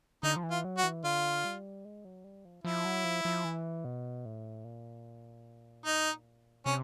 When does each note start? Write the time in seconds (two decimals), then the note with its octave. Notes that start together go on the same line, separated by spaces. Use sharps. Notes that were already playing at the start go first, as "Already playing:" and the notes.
0.23 D3 D#4
0.36 F3
0.43 E3
0.51 F4
0.64 F#3
0.78 F#4
0.83 E3
1.04 D3 F4
1.45 G3
1.85 G#3
2.05 F#3
2.24 G3
2.45 F3
2.64 F3 E4
2.85 F#3
3.04 F3
3.25 F3
3.45 E3
3.85 B2
4.25 A2
4.65 A#2
5.86 D#4
6.66 C3 C#4